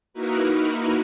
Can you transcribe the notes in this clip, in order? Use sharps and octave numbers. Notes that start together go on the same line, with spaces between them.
A#3 D#4 E4 F#4 A#4 B4